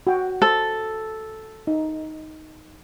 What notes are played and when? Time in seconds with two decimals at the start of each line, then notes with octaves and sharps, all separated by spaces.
0.07 F#4 G5
0.42 A4 C5
1.67 D#4